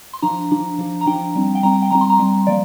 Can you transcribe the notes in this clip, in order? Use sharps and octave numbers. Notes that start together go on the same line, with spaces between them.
C6
F3 D4 A#5
F3 D4
F3 D4
A#5
F3 D4 G5
G3 C4
G5
G3 C4 A#5
G5
G3 C4 A#5
C6
A#5
G3 C4
F3 A#3 D5